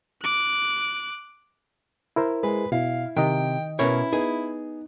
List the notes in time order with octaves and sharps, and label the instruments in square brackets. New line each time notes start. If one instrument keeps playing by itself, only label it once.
[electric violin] D6 F#6
[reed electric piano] E4 A#4 C5
[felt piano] G#3 [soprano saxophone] B4
[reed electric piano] B2 [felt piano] E4 [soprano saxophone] F5
[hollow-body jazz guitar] C3 [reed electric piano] D#3 D#5 [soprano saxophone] G5
[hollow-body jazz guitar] B2 A#4 C#5 [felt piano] C#4 B4 [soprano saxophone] E4
[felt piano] B3 [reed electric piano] D#4 [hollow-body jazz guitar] G#4